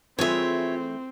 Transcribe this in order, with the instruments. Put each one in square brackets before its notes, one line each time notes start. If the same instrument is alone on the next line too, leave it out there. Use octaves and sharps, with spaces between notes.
[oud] E3 A3 G#4 [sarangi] C4 [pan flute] F4 [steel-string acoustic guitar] C#5 E5